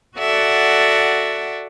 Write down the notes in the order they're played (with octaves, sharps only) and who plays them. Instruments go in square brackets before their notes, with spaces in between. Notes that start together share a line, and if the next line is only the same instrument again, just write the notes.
[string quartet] F#4 A4 D5 E5 F#5